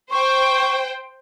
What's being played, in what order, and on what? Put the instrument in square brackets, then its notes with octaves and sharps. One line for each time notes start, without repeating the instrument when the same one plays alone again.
[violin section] C5 G5 [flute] C#6